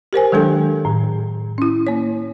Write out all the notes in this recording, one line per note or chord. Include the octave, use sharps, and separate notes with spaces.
G4 A#4 C5 G#5
D#3 F#3 G#3 D4 A4
A2
C#4 E4
A#3 C#5